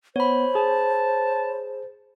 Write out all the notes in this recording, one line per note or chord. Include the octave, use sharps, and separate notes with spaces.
B3 C5 C#5 B5
G#4 A5